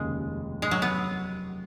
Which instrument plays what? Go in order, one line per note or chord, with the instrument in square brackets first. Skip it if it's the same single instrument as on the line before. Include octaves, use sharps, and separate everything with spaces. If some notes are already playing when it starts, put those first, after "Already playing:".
Already playing: [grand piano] F1 D#2 C#3 [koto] G#3
[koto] G#3
F#3
B3